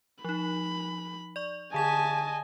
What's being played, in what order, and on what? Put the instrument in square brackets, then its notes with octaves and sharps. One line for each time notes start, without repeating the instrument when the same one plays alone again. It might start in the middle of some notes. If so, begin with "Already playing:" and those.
[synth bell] F3 D#4 [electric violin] B5
[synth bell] D5 C#6
[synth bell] D3 G#4 G#6 [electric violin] D#5 G#5 [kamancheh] A5